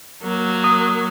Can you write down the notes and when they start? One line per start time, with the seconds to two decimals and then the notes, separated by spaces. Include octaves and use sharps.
0.23 F#3 A#3
0.64 D#6